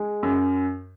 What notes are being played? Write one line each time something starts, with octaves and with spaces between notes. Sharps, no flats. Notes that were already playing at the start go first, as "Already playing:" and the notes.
Already playing: G#3
F#2